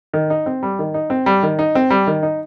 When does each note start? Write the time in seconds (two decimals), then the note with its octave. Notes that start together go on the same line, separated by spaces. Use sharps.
0.13 D#3
0.30 D#4
0.46 C4
0.63 G3
0.79 D#3
0.94 D#4
1.10 C4
1.26 G3
1.43 D#3
1.59 D#4
1.75 C4
1.90 G3
2.07 D#3
2.23 D#4